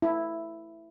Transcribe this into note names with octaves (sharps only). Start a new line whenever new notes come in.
E4